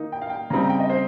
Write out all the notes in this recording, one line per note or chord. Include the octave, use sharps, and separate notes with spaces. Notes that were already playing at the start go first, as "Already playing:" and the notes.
Already playing: D#3 A#3 D#4
G5
F5
G5
C#3 G3 C4 D#4 A#5
A#5
G5
D#5
C5